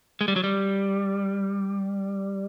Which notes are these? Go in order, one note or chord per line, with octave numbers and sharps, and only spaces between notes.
G#3
G3
F#3
G3